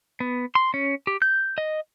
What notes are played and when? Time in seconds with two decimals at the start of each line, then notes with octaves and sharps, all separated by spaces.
0.20 B3
0.55 C6
0.74 C#4
1.07 G4
1.22 G6
1.58 D#5